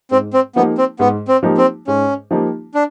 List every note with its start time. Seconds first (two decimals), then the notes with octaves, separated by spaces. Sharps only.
0.11 G#2 C4
0.34 C4
0.56 F3 A#3 B3 D#4 G4
0.78 C4
0.99 G#2 B3
1.28 C4
1.43 F3 A#3 D#4 G4
1.57 C4
1.87 G#2 C#4
2.31 F3 A#3 D#4 G4
2.75 D4